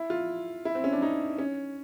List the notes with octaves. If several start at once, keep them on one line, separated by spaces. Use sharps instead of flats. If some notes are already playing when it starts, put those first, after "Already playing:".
Already playing: E4
F4
E4
C4
C#4
D4
D#4
C#4